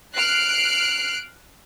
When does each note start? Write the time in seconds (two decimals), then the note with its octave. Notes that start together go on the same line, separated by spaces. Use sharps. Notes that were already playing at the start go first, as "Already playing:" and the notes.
0.16 F6 F#6 C7 D7